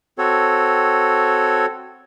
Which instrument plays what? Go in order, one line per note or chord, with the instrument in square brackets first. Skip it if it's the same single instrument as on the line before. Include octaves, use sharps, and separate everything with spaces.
[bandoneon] C4 F#4 A4 C#5